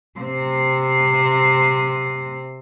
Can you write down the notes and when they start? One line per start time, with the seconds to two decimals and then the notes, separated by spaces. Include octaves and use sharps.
0.19 C3 C4